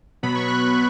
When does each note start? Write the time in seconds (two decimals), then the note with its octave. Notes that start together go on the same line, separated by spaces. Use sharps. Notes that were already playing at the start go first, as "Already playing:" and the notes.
0.23 B2 F#3 B3 B5
0.35 C#6
0.48 F#6
0.61 F#6